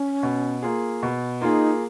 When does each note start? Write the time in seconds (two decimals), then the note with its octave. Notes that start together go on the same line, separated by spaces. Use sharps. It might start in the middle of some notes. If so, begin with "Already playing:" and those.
Already playing: C#4
0.23 B2
0.62 A#3 F4 G#4
1.03 B2
1.41 A#3 D#4 F4 G#4